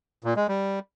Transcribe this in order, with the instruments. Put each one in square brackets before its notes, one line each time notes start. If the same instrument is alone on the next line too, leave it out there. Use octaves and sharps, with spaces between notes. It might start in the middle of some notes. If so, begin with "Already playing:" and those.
[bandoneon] A#2
G#3
G3